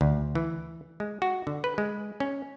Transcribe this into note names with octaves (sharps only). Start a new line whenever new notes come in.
D2
E3
G#3
F#4
D3
B4
G#3
C#4